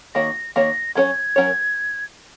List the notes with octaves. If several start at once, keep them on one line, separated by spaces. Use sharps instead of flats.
D#3 A#3 F#4 C#5 A#6
D#3 A#3 F#4 C#5 A#6
F#3 C#4 A#4 C#5 G#6
F#3 C#4 A#4 C#5